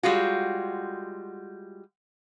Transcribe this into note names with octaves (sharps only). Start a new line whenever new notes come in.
G3 G#3 F4 F#4